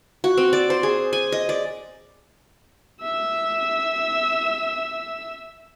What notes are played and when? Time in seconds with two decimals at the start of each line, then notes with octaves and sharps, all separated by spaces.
0.24 F#4
0.37 C4
0.53 D5
0.70 C5
0.83 G#4
1.13 G#5
1.32 D#5
1.49 D5
3.02 E5 E6